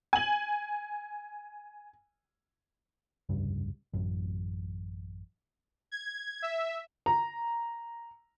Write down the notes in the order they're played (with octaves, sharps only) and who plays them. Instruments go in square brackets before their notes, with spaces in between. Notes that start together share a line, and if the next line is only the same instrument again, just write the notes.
[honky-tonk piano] G#5 F#7
[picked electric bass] F1 C#2 G2
A1 F#2
[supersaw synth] G#6
E5
[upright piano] A#5